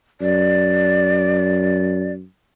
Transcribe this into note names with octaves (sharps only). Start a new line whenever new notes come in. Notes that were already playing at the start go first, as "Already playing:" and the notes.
F#2 D5